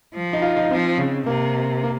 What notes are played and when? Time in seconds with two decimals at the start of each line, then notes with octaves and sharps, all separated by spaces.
0.14 F3
0.33 D#4
0.42 F4
0.57 D#4
0.71 F3 C4
0.98 C#3
1.26 C3 A#3
1.84 A#3